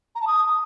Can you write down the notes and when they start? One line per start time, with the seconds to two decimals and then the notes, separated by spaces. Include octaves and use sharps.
0.15 A#5
0.21 A5
0.27 D#6